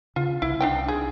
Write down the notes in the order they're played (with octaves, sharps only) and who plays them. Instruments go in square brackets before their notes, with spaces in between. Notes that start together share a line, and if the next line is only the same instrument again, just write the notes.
[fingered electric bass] C#3 [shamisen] F4
[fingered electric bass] C2 [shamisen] E4
[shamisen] D4 D#4 G5
G#4